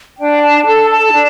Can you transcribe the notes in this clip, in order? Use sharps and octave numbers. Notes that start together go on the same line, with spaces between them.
D4 G5
A5
A4 A5
A5
D4